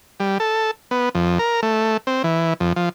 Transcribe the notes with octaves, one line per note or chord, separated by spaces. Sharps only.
G3
A4
B3
F2
A#4
A3
C4
E3
F2
F3